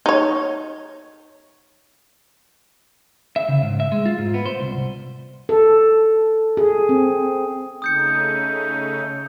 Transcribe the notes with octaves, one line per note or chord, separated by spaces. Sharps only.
D#4 C#5
E5
C#3
G#2
E5
G#3
F4
G#2
B3
C5
C2
A4
G#4
C4
C#3 A3 D#4 D#6 G6 C#7